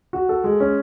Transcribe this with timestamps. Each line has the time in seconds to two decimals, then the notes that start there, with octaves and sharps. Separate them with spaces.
0.13 F#4
0.29 A4
0.44 G#3
0.60 C#4